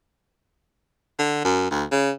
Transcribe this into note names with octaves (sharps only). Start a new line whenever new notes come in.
D3
F#2
D2
C#3